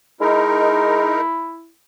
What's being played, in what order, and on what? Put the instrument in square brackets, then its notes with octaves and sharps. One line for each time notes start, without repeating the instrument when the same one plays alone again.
[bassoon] G#3 [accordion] D#4 A#4 [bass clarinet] E4